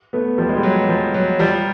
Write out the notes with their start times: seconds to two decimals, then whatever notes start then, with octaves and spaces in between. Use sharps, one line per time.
0.13 A3 B3
0.38 F3 G3
0.49 G#3
0.57 G3
0.63 F#3
0.89 F3
1.14 F#3
1.39 F3 G3